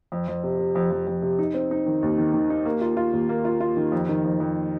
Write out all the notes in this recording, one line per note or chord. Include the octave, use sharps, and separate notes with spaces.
F2
F2
C3
C3
F2
F2
F2
C3
D#4
C4
D#4
D#3
D#2
D#3
D#3
D#4
A#3
F4
F4
D#2
A#3
F4
F4
D#3
F2
D#3
F2
F2